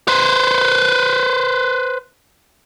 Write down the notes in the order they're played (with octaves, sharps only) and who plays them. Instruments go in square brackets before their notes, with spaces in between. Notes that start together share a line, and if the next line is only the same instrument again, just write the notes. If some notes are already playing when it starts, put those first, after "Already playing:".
[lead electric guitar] B4 C5